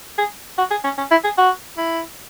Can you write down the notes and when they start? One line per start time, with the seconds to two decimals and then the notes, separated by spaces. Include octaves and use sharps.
0.18 G#4
0.58 F#4
0.71 G#4
0.84 C#4
0.98 C#4
1.11 E4
1.24 G#4
1.38 F#4
1.77 E4